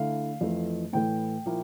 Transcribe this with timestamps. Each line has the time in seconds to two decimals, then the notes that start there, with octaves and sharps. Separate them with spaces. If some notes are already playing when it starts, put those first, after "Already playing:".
Already playing: D3 A3 E4 F5
0.41 F2 E3 A3
0.93 A2 E3 A3 G5
1.46 A#2 F3 A#3 E4